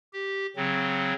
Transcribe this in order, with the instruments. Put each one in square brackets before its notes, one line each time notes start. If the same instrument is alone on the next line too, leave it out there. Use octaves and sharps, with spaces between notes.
[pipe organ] G4
C#3 F#3 C4